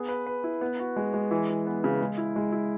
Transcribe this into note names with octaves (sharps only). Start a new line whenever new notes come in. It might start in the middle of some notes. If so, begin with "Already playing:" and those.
Already playing: B3 G#4
B4
B4
E4
B3
F#4
G#3
G#3
E3
E3
B3
C#3
G#3
E4
G#3
E4